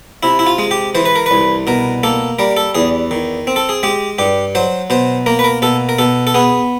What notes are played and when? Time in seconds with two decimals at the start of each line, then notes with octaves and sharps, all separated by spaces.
0.23 C3 E4
0.39 E4
0.46 F4
0.58 G#3
0.71 G4
0.95 E3 C5
1.05 B4
1.16 A#4
1.26 C2 B4
1.67 B2 A#4
2.03 A#3 A4
2.39 G3 A#4
2.57 A4
2.75 E2 G#4
3.11 D#3
3.47 C4
3.56 A4
3.69 G#4
3.83 G#3 G4
4.18 G2 G4
4.55 F#3 C5
4.90 B2 C5
5.26 A#3 A#4
5.39 B4
5.44 A#4
5.62 B2 A4
5.89 A#4
5.99 B2 A4
6.27 A4
6.34 B3 G#4